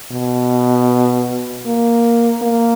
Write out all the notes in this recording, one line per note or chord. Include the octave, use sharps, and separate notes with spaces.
B2
A#3
A#3